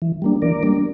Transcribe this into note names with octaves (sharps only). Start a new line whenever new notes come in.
E3
G3 A#3 D4
E3 A#4 D5
G3 A#3 D4